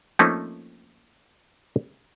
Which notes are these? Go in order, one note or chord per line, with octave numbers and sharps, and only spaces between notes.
F3 A3 A#3 C4 C#4 D#4